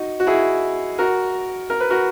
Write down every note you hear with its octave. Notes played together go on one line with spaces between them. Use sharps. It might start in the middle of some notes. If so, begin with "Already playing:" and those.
Already playing: D#4 F#4
F#4
E4 G#4
F#4 A#4
A#4
B4
F#4 A#4